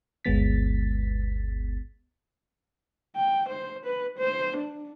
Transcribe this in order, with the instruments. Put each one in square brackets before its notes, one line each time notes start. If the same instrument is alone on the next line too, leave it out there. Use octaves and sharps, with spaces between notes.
[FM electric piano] G1 D2 G#3 B3 A6 B6
[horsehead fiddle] G5
C5
B4
C5
D4